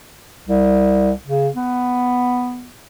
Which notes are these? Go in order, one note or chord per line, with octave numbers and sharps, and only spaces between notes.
C2
C#3
B3